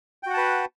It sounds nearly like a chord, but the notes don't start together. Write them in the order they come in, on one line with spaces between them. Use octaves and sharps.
G5 F#4 F#5 A5 B4